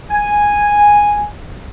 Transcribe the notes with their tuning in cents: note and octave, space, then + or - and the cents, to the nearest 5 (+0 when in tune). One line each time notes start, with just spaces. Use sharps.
G#5 -5